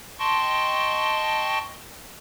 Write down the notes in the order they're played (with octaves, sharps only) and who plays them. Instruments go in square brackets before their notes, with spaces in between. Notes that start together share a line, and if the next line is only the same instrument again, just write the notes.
[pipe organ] D#5 G5 A5 C6 C#6